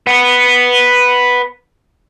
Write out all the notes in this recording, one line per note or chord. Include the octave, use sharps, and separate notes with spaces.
B4 F#5